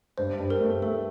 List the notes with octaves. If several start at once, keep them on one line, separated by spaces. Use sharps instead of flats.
G2 C5
G2
A#4
A3
A3 A4